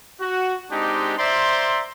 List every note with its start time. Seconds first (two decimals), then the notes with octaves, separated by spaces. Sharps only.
0.21 F#4
0.71 G#3 C4 D4 D#4 G4
1.18 C5 D5 E5 A#5 C6